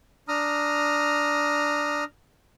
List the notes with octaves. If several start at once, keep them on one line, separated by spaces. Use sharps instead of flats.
D4 A#5 D#6 F6